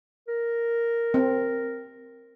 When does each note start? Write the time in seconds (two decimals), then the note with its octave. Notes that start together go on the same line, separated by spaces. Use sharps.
0.28 A#4
1.14 C4